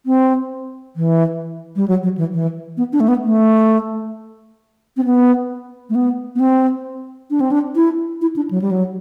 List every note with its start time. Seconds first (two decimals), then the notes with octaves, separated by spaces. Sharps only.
0.06 C4
0.96 E3
1.76 G3
1.88 F#3
2.03 F#3
2.18 E3
2.33 E3
2.77 B3
2.93 D4
3.00 A3
3.08 B3
3.23 A3
4.97 C4
5.05 B3
5.90 A3
5.95 B3
6.35 B3
6.40 C4
7.30 D4
7.41 C4
7.52 D4
7.76 E4
8.21 E4
8.36 D4
8.51 F#3
8.62 G3
8.71 F#3